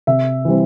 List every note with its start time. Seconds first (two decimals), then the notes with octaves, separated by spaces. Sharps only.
0.07 C3 E5
0.45 E3 G3 C4